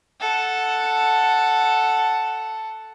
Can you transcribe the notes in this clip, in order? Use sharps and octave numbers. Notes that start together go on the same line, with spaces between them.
A4 F#5